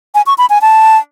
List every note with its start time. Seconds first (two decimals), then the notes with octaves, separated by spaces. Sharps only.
0.15 G#5
0.26 C#6
0.38 B5
0.50 G#5
0.62 A5